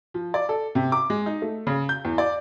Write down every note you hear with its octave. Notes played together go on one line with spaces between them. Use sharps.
F3
D5
A4
C3
D6
G#3
D#4
A3
C#3
G6
E2
D5